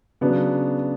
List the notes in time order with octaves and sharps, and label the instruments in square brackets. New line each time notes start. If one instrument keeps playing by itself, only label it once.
[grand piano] C#3 F#3 B3 D4